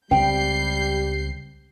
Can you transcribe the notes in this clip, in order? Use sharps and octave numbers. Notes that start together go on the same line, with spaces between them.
C#2 G3 C4 G5 G6 C7